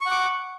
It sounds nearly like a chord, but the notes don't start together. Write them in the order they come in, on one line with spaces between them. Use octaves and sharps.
C#6 F#5 D6